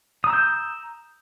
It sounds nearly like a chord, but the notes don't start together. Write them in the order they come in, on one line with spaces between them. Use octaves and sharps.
D#6 A#5 E6 G6